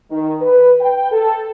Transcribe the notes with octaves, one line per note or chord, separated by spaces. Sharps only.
D#3
B4
G5
A4